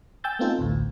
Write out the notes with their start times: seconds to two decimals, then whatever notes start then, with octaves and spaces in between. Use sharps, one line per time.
0.24 G5 G#5 E6 G6 A6
0.39 A3 B3 C4 D#4 F4 A4
0.59 A1 D2 A2